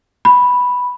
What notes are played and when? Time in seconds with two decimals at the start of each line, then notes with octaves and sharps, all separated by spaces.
0.25 B5